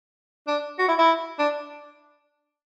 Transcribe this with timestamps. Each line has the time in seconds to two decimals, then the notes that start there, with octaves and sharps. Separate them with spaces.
0.48 D4
0.79 F#4
0.88 E4
0.99 E4
1.39 D4